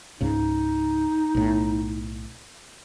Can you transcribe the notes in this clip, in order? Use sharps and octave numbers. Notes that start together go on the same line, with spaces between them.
C#2 G#2 C#3 D#4
B1 A2